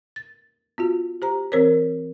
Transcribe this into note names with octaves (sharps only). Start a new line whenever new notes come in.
A6
B3 F4 F#4
G4 C5 A#5
E3 C4 A#4 C5 C#5